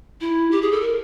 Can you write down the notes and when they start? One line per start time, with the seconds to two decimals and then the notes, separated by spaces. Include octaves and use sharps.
0.21 E4
0.51 G4
0.62 G#4
0.72 A4
0.81 A#4